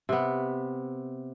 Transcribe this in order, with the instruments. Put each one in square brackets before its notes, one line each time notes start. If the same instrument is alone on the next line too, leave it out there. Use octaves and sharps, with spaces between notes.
[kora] C3 B3